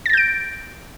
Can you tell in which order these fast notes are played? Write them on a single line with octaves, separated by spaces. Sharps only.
A6 A#6 G6 D7